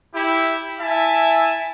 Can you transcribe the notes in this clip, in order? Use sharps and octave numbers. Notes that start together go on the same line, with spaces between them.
E4 G4
E4 E5 G#5 A5